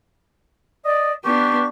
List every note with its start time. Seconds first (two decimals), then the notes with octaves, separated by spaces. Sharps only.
0.85 D5 D#5
1.25 B3 D4 G4 C#6